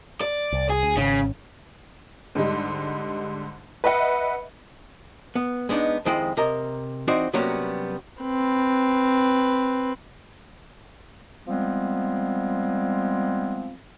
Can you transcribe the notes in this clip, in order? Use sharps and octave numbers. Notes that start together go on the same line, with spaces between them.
D5
C2
G#4
D2
G#1 C#3 C#4
G#2 D3 G3 D#4
B4 D#5 E5 F#5
B3
G#3 B3 D4 D#4
F2 D#3 G#3 E4 C5 G5
C3 A#4 D#5 A#5
E3 C4 D#4 F#4 C5 D5
C3 F#3 G3 A#3 B3 C#4
C4 B4
F3 G3 G#3 B3 C4